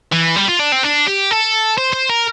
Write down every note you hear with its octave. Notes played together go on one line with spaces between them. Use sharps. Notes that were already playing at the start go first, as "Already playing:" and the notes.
E3
G3
F4
D4
C4
D4
G4
A4
C5
C5
A#4